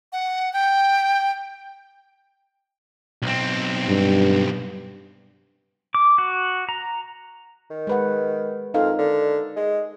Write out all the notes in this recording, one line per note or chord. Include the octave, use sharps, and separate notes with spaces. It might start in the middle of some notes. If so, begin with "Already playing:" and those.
F#5
G5
B1 C4
G2
D6
F#4
A#5
D#3
G#3 B4 F#5
F2 D#4 A#4 F5
D3
G#3